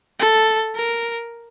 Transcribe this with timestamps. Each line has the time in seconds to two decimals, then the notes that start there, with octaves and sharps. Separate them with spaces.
0.20 A4
0.75 A#4